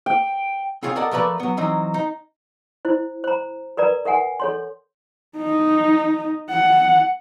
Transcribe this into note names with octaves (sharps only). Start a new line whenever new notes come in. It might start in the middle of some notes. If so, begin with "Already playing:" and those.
G5
C4 F4 G#4 C#5 D5 F5
A4 A#4 D5 D#5 F#5 A5
F3 A3 A#4 B4 D5
F#3 B3
E3 F#3 C4 D#4
D#4
E4 C5
C5 A#5
A#4 B4 D5 A#5
A#4 E5 F#5 G#5
A4 C#5 C6
D#4
F#5